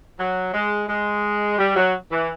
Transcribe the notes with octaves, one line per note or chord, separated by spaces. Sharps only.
F#3
G#3
G#3
G3
F#3
E3